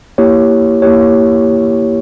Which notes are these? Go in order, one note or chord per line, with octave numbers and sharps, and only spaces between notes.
A#3 E4 G4 C#5
A#3 E4 G4 C#5